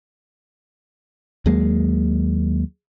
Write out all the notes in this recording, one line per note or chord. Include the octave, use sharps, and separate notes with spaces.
D#2 F#3 G#3 A#3